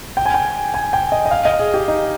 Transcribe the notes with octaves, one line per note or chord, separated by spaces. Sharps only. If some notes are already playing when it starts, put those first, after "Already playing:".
G5
G#5
G5
G#5
G5
D#5
D#5
F5
D#5
G#4
G4
D#4